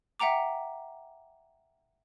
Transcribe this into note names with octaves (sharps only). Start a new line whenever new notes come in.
E5 F#5 G5 A#5 D6